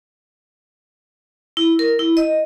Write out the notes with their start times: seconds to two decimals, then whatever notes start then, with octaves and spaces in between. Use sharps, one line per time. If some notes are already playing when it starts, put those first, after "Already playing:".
1.57 E4
1.79 A#4
1.99 E4
2.17 D#5